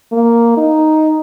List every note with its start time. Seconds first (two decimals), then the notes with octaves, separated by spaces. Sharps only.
0.12 A#3
0.57 D#4